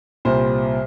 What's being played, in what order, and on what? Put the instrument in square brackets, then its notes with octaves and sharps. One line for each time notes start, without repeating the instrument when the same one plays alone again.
[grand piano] C2 A#2 G3 C5